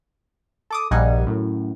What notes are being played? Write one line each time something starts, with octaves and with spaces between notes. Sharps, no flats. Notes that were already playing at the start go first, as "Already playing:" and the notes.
A4 D6 D#6
A#1 G2 G3 D#4 F#5 G#5
F#2 A2